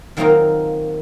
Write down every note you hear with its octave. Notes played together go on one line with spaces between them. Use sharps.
D#3 F#3 A#3 C4 D#4 F4